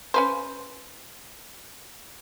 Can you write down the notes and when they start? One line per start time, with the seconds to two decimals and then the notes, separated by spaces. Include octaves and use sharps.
0.14 C#4 B4 C5